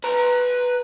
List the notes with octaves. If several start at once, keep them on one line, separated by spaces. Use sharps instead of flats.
B4 A#5